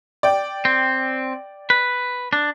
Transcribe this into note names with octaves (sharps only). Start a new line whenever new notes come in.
D5 G5
C4
B4
D4